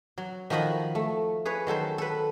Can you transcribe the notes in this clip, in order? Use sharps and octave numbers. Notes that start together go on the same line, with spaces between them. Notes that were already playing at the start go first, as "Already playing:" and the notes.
F#3
D#3 F3 F#4 D#5 B5
A3
G#4 B4 C#5
D#3 F#3 A4 C5
A4 B4